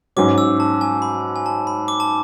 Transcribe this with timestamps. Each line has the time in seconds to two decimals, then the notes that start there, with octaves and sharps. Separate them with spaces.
0.16 G#2 F#3 C#4 D6
0.38 E6
0.60 A5
0.81 G#5
1.02 B5
1.36 G#5
1.46 A5
1.67 B5
1.88 D6
2.00 A5